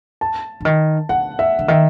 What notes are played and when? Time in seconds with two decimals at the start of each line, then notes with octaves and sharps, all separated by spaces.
0.21 A5
0.60 D3
0.65 D#3
1.09 D3 F#5
1.39 E5
1.59 D3
1.68 D#3 E5